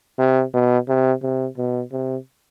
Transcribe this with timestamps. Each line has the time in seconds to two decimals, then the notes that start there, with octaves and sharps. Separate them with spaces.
0.19 C3
0.54 B2
0.88 C3
1.23 C3
1.58 B2
1.92 C3